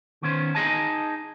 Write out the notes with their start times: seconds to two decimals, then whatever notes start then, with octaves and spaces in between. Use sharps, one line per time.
0.22 D#3 B3 C#4 C5
0.55 D#4 F#4 G#4 D#5 G#5 A5